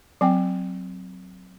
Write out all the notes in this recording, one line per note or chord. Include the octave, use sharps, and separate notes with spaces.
F#3 C4 G5